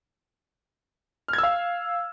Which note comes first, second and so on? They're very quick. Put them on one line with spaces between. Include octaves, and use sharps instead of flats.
F6 G#6 E6 F5